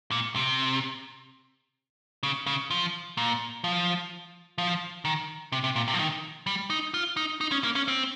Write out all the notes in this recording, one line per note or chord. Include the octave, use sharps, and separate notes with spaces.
A#2
C3
C#3
C#3
F3
A#2
F3
F3
D#3
C3
C3
A#2
C3
F3
D#3
G3
D#4
F4
D#4
D#4
C#4
A#3
C#4
C4